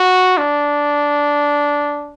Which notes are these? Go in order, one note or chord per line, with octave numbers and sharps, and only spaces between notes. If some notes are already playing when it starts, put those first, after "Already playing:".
Already playing: F#4
D4